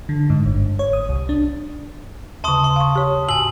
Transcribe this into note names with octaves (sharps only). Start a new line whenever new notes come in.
D3
G#2
G1
C#5
D#6
C2
D4
D#2 C#3 A5 C6 D#6
C6
F5 C#6
G4 C#5
G#2 G#5 E6 F#7